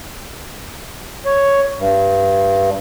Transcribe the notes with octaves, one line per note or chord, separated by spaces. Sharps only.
C#5
G2